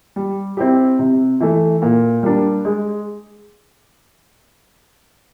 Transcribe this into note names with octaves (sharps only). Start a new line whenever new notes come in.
G3
C4 E4 G4
C3
E3 A3
A#2
G3 A#3 D4
G#3